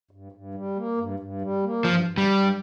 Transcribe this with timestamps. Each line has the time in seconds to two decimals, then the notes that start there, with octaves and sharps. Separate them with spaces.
0.11 G2
0.32 G2
0.54 G3
0.76 A#3
0.98 G2
1.19 G2
1.42 G3
1.63 A#3
1.84 G2 F3
2.06 G2
2.18 G3
2.28 G2